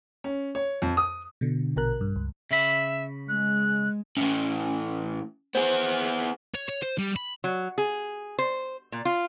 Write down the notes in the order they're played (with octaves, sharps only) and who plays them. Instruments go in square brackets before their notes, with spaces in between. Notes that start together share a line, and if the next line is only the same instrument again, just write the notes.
[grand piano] C#4
C#5
F2
D#6
[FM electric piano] B2 D3
A#1 B2 A#4 F#6
G2
C#2
[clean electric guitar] C#3 B5 [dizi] E5
[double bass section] G#3 [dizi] F#6
[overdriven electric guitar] A2 E3 [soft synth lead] C#4
[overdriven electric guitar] B3 G#4 [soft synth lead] C5
[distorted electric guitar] C#5
C#5
C5
G3
B5
[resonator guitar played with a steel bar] F#3
G#4
C5
A#2
F4